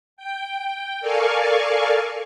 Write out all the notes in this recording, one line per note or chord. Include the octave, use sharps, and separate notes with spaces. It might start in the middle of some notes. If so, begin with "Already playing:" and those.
G5
A4 A#4 D5 F5 G#5 C#6